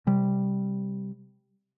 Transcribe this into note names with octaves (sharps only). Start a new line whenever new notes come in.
C3 G3